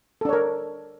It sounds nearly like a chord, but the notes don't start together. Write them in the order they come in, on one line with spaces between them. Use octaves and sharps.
A4 D4 C#5 A#4